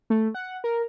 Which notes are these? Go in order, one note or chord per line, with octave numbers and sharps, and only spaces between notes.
A3
F#5
A#4